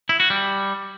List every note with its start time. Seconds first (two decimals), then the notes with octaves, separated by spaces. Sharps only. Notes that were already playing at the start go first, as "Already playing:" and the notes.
0.09 E4
0.20 F#4
0.30 G3